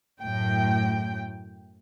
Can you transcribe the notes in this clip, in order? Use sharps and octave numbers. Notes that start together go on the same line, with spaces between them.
F#2 A2 G5